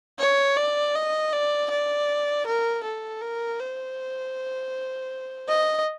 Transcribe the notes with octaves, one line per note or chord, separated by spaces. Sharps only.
C#5
D5
D#5
D5
D5
A#4
A4
A#4
C5
D#5